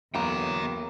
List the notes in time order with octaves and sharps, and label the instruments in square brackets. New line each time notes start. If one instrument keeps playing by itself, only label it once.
[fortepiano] B1 F#3 [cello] E2 [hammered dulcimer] A#3 C#5 [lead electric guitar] G5 A#5